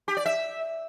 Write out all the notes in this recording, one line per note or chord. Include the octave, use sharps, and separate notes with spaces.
G4
D5
E5